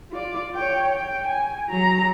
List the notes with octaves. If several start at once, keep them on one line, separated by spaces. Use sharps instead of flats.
F4 D5
C#5 G5
G5
G#5
F#3 A#5